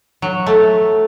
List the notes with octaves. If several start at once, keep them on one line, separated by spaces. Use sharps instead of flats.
F#3
A3